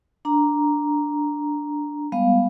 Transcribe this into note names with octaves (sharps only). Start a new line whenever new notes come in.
D4 A#5
G3 G#3 B3 F5